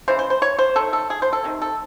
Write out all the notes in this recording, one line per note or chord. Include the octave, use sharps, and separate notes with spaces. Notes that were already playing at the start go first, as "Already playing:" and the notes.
C#3 E3 G#3 C5
C5
C5
C#5
C5
D#3 A3 A4
A4
G#4
C5
A4
C3 D#3
A4